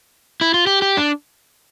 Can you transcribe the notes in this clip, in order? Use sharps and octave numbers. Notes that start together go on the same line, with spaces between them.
E4
F4
G4
G4
D4